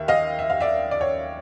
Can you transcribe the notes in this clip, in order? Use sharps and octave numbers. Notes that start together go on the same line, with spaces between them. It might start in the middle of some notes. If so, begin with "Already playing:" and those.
Already playing: D#2 E5
D#5 F5
E5
F5
D5 E5
D5
C#5